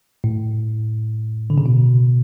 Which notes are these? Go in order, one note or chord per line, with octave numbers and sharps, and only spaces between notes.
A2
D3
C#3
B2